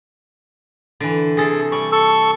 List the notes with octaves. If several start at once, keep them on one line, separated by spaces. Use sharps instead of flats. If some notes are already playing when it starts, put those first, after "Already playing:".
D3 E3
C3 G#4 A4
G3 C#6
A4 C#6 E6